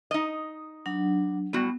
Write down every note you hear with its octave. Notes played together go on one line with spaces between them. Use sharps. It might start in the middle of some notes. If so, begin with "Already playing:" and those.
D#4 D#5
F#3 D4 F#5
A2 G3 B3 F#4